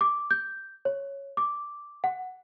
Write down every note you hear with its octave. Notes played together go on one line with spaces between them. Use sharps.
D6
G6
C#5
D6
F#5